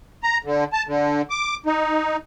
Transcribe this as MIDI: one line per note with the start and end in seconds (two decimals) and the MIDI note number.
0.23 0.37 82
0.44 0.64 50
0.73 0.83 81
0.87 1.21 50
1.30 1.56 86
1.66 2.16 63